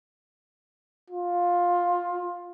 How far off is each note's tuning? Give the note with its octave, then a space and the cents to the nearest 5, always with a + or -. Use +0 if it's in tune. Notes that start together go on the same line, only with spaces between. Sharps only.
F4 +15